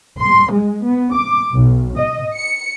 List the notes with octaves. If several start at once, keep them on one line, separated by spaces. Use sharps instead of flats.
C6
G#3
B3
D6
B1
D#5
C#7